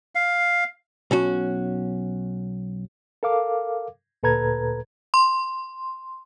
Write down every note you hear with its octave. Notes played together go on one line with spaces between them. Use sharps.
F5
B1 C#4 F#4
A4 A#4 F5 D6
D2 A#2 A4 B4 A#5 G#6
C6